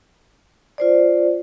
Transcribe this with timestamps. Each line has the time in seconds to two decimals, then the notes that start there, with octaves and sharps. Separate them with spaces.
0.78 F4 C5 D5